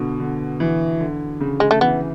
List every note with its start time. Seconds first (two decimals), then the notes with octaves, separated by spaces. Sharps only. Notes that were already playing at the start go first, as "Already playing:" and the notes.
Already playing: B2 D3
0.20 D3
0.60 E3
1.00 D3
1.41 C#3
1.60 G#3
1.71 A3
1.81 E3 B3